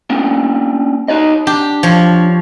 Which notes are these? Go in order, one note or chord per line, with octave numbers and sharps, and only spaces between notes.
A#3 C#4 D4
D#4 C#5 D#5
D4 G4
F3 C#5